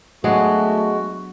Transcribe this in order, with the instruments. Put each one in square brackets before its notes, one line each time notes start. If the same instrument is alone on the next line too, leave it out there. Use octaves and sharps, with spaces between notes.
[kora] F#3 B3 D4 [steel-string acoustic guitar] G#3 [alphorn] A3 [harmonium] F#4